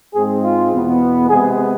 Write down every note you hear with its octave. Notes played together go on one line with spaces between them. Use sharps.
G#2 G#3 C4 G#4
F4
E2 B2 B3
C3 G#3 B3 G#4